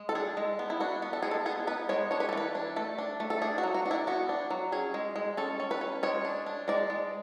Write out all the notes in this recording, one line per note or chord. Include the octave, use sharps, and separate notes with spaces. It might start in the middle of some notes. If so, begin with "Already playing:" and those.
Already playing: G#3
A4
D4 G#4
G#3
B3
E4
D4 F#4
B3
A4
G#3 G#4
A4
B3 G#4
B3 B4
G#3 C#5
D4 C#5
B4
A4
E3 B4
D4
A3 A4
D4
A3
A4
D4 G#4
F#4
F#3
F#4
D4
E4
B3 F#4
D4
F#3
C#4 G#4
G#3
G#3
C#4 A4
C#4
B4
C#4
G#3 C#5
D4
D4
G#3 D5
G#3